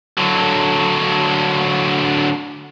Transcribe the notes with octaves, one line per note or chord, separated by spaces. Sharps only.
D3 F#3